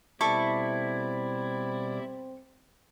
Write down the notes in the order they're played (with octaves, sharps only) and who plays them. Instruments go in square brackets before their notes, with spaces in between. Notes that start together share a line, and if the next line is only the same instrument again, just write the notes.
[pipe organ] B2 G3 D5 [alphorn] C4 [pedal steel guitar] E4 [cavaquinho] A4 C#6 D6